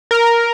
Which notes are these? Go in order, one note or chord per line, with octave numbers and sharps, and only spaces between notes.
A#4